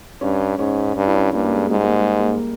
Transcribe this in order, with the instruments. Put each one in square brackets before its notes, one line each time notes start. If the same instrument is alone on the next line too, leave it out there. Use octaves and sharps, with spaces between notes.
[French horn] G2 [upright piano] C#4
[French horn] G#2 [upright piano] C#4
[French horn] G2
[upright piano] E4
C#4
[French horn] G2 [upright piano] A#3
[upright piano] A#3
G#3
G#3
[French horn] G#2 [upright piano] G3
[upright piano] A#3
G#3
A#3